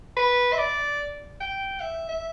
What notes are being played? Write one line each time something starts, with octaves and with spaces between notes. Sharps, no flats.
B4
E5
D5
G5
E5
E5